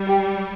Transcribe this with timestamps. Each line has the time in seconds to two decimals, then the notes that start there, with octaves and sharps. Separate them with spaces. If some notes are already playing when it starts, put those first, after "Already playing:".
Already playing: G3
0.08 G4